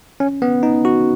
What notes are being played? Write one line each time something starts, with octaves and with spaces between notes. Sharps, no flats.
C#4
B3
D#4
F#4